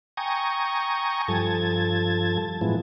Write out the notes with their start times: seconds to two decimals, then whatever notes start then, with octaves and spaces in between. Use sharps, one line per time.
0.17 G5 G#5 A#5 C#6 D#6
1.28 G2 F3 A4 A5 G#6
2.61 A2 E3 F3 G#3 B3